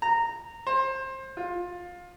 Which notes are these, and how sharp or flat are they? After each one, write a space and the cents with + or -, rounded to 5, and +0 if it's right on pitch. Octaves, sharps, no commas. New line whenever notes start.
A#5 -15
C5 +25
F4 +20